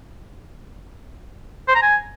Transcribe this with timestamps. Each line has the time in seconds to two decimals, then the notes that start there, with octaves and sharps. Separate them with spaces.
1.68 C5
1.75 A#5
1.82 G#5